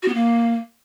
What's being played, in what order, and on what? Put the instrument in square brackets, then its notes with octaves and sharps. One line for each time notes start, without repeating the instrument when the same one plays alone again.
[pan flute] F#4
B3
A#3